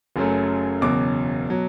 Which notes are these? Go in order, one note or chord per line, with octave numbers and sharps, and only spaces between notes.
F#1 F#2 C#3 F#3 A3
F#1 E2 B2 F#3 D6
B2 F#3